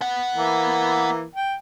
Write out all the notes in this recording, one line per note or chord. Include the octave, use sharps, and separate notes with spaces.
B3 F#5
E3 A#3
G5